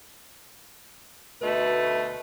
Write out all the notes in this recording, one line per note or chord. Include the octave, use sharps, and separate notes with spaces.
D2 B2 A3 D#4 B4